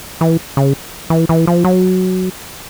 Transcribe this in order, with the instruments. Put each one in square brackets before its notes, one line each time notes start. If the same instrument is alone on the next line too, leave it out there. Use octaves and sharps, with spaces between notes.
[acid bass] E3
C#3
E3
E3
F3
F#3